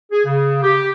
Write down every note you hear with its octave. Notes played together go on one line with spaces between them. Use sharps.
G#4
C#3
G4